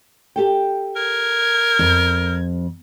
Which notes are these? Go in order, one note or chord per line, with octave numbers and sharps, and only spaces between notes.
G4 A4 G5
A#4 G#6
F2